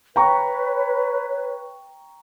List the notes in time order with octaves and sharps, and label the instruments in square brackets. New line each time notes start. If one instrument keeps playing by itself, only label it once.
[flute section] B4 C#5 [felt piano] G5 A#5 C#6